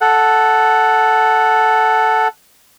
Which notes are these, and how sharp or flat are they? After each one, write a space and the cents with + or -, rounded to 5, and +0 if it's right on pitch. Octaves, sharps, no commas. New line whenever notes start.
A4 +0 F#5 +0